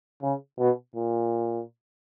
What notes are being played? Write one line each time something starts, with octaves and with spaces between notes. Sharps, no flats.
C#3
B2
A#2